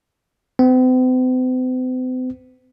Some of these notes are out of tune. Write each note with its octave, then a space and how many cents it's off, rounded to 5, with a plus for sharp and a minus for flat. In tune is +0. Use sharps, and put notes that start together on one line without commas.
C4 -45